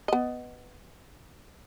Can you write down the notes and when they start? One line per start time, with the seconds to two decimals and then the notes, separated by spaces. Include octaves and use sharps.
0.08 B3 D#5